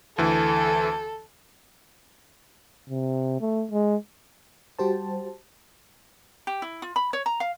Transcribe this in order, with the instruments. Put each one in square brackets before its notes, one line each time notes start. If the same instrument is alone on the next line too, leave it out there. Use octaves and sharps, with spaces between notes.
[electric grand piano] D2 E3 [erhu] A4
[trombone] C3
A3
G#3
[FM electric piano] G3 F#4 G4 C5 A5
[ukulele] G4
E4
F4
B5
C#5
A#5
F5